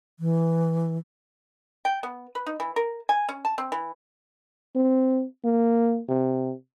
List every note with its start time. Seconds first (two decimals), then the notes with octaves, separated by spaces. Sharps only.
0.20 E3
1.85 G5
2.03 B3
2.35 B4
2.46 D#4
2.60 E3
2.76 A#4
3.09 G#5
3.29 C#4
3.45 A5
3.58 C4
3.72 E3
4.76 C4
5.44 A#3
6.09 C3